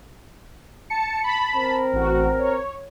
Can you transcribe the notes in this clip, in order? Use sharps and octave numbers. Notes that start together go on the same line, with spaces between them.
A5 C#7
A5 B5
C4 A#4
A1 F#4
C#5